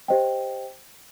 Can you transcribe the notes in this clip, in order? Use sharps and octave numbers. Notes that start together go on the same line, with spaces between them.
G4 C5 D#5 G5